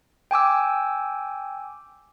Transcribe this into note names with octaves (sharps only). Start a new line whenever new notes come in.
G5 G#5 D6 E6